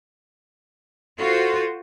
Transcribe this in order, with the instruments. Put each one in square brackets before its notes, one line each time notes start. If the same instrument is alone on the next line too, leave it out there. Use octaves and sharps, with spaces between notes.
[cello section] F4 F#4 C5 [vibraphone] A4